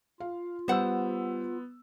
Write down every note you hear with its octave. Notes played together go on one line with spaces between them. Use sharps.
F4 F5
G3 B3 C5 F#5 E6